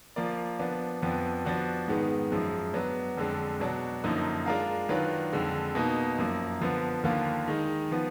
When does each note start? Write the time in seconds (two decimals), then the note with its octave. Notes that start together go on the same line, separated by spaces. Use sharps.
0.16 F3 A#3 F4 A#4 D5
0.60 F3 B3 D4
1.02 F2 F3 B3 D4
1.45 F3 B3 D4 F#4
1.88 G#2 D#3 G#3 B3
2.32 F#2 F3 G#3
2.74 F#3 B3 D4
3.17 F2 D3 G#3 D4
3.60 B2 F#3 D4
4.04 F#2 D3 F3 A#3 D#4
4.46 G#3 D4 F4 A#4 F5
4.89 D#3 F#3 D4 F4 B4
5.33 F2 D3 G#3
5.75 B2 A#3 D#4
6.18 F#2 F3 A#3
6.61 D3 F3 B3
7.03 D#2 D3 F3 A#3 F4
7.48 D#3 G#3 D#4
7.91 F3 B3